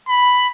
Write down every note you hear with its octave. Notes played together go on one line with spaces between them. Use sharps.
B5